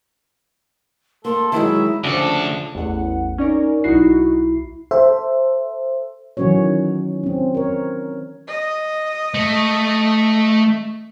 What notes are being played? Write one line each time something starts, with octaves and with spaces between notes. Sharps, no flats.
A#3 A4 C6
D#3 F#3 G#3 E4 E5
D2 C#3 F3 D4 A4 A5
A1 E2 F#5
C#4 D#4 A#4 D5
B1 D#4 E4 F#4 C7
A4 C5 E5
D#3 E3 F#3 C#4 F#4 C#5
C4 C#4
A#4 C#5
D#5
A3